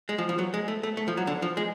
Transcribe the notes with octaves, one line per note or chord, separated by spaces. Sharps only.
G#3
F3
F3
F#3
G#3
A3
A3
A3
F3
F#3
D3
F3
G#3